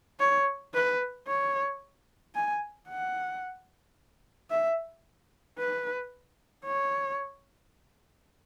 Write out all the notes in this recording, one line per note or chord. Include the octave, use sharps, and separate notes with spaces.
C#5
B4
C#5
G#5
F#5
E5
B4
C#5